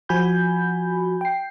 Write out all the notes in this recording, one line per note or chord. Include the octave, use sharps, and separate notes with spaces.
F3 F#4 G#5 B5 G6
G5 C7